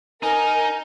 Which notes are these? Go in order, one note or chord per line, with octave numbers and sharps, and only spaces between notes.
D#4 A#4 G#5